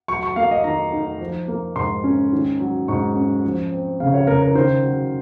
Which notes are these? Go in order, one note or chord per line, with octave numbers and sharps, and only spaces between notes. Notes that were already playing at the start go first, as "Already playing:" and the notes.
F#3 C#6
C#6
A#3 F5
D#5
D#3 A#5
D#4
F3
A#3
G#2 C6
C#4
D#3
F#3
G#2 C#6
C#4
F3
C4
C#3 F5
C#5
C#3 A#4
A#4
D#3 C5
F#3